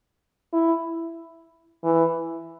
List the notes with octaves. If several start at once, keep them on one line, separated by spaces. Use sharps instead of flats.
E4
E3